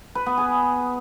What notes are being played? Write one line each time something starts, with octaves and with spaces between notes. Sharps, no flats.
B4
B3
G#4